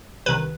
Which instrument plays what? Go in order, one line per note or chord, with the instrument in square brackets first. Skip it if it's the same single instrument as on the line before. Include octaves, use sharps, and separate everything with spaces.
[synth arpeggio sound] C2 C3 D#3 B4